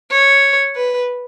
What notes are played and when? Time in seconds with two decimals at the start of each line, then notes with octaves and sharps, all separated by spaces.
0.12 C#5
0.76 B4